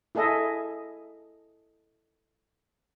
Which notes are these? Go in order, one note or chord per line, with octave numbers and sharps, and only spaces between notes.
E4 G#4 A4 D#5 E5